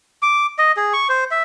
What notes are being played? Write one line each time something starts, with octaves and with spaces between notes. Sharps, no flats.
D6
D#5
G#4
C#6
C5
E5